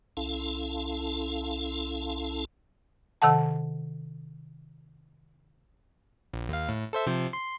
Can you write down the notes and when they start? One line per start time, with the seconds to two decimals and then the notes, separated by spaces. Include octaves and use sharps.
0.17 C2 C#4 E4 A4 F5 A5
3.22 C3 D#3 A4 F#5 A5
6.34 A#1
6.49 D#2 F5
6.69 A2
6.93 A4 C5 E5
7.07 C3 F3 C4
7.33 C6